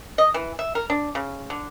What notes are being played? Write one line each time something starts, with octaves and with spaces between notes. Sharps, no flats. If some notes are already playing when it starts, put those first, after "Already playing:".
D#5
E3
E5
A#4
D4
C#3
D3